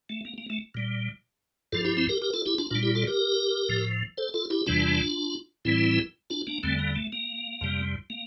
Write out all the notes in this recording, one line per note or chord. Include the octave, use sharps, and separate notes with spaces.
A3
A#3
A#3
A3
A#2 G3
G2 F3 F4 A4
E4 G4
C4 E4
G4 A#4
G4 A#4
F4 A4
E4 G4
D4 F4
A#2 G3 D4 F4
E4 G4
F4 A4
G4 A#4
A2 F3
A4 C5
F4 A4
E4 G4
E2 C3 E3 G3 D4 F4
A2 E3 G3 C4 E4
D4 F4
A#3 D4
E2 D3 G3 A3 C4
A#3
A3
A#3
F2 C3 G3
A#3